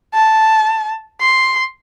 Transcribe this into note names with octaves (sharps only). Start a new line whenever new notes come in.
A5
C6